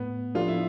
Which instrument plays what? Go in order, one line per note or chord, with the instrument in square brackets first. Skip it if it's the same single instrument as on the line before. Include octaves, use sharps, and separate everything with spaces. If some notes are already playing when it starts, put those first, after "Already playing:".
Already playing: [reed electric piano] A2 [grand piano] B3
[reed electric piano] F3 B3 D4 A4 [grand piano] F4
[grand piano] E4